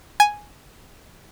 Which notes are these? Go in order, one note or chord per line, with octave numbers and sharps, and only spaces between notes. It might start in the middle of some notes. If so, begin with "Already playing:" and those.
G#5